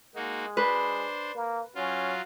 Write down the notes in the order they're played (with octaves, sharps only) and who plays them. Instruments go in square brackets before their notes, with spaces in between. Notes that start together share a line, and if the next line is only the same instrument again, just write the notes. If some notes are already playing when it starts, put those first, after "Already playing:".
[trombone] G#3 [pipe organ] A#3 D#4 F#4
[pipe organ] D4 C5 [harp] B4
[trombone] A#3
[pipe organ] F#3 F4 [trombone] C#4